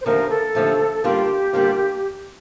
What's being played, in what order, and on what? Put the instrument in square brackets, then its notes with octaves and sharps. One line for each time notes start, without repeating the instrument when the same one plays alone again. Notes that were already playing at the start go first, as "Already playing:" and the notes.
[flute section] C5
[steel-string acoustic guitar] D#2 D3 F3 A3 [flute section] A#4
[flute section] A4
[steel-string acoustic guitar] D#2 D3 F3 A3
[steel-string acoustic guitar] D3 G3 A#3 D4 F4 [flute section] G4
[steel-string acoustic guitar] D3 G3 A#3 D4 F4